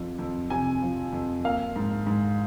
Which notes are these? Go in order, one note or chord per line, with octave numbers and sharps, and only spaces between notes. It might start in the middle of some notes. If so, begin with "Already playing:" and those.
Already playing: F2 F3
F2
C3 G#5
F3
F2
A#3 F5
G#2
G#2